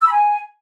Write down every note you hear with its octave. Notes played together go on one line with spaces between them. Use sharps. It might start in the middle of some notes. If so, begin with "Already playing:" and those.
E6
B5
G#5